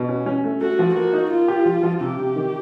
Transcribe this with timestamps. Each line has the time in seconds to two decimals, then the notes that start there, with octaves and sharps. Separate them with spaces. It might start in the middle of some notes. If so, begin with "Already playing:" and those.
Already playing: B2
0.09 C#4
0.26 C#4
0.44 A3
0.61 A3 F#4
0.79 F3
0.96 A#3 F#4
1.13 D#4
1.31 A#3 F4
1.48 G4
1.65 F3
1.83 F3
2.01 C3 G4
2.18 C3
2.36 D#3